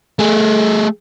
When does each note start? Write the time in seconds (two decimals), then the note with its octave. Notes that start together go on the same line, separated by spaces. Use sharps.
0.19 A3 G#4